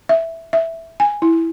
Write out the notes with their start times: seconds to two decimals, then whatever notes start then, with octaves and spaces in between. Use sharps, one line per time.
0.09 E5
0.53 E5
1.00 G#5
1.22 E4